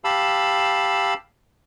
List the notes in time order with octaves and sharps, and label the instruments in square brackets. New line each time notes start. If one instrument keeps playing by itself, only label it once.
[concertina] G4 F5 A5 B5 E6